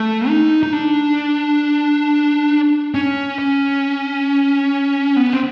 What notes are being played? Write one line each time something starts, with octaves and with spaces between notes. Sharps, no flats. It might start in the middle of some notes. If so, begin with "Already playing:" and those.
Already playing: A3
D#4
D#4
D4
C#4
C#4
B3
C4